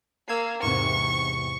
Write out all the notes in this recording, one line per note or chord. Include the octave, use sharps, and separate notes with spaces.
A#3 E6 G#6 C7
E2 G#2 C3 C#6